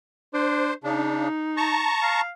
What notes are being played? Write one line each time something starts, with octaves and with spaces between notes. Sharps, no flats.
D4 C5
C#3 D4 D#4
A5 A#5 C#6
F5